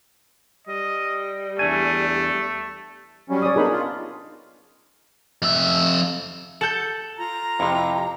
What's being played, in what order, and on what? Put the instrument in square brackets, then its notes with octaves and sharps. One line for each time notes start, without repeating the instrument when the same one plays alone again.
[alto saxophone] G3 [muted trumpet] D#5
[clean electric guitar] E2 D4 G#5 [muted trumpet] A3
[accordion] F#3 G3 C#4
[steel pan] C#5 D5 D#6
[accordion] B3 D4 D#4 [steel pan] G#4 A#4 B5
[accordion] F4
[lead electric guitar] F2 E5
[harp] A4 A5 G6 [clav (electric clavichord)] F#5
[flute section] F4 A#5
[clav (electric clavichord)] F2 C3 [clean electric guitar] E4 G4